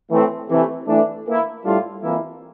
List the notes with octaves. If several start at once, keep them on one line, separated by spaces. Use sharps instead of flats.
A2 E3 A3 C4
C3 E3 A3
E3 A3 D4
E3 A#3 E4
A2 G3 D4 F4
F2 E3 A#3 E4